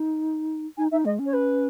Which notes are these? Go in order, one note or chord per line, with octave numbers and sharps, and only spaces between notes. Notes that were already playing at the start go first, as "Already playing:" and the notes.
Already playing: D#4
D#4 G#5
D#4 E5
G#3 D#5
C#4
C#5
B4